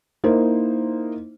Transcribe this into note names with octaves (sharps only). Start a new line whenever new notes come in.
A#3 D#4 E4 C5